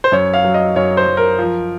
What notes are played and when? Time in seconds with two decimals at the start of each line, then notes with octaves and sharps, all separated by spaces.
0.04 C5
0.12 F#2 C#5
0.34 F5
0.44 F#3
0.54 D#5
0.76 F#2 C#5
0.97 C5
1.07 F#2
1.17 A#4
1.39 F3